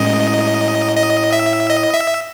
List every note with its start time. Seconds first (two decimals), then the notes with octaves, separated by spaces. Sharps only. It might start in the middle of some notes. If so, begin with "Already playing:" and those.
Already playing: A2 G#3 C#4 D#5
0.96 D#5
1.33 E5
1.70 D#5
1.94 E5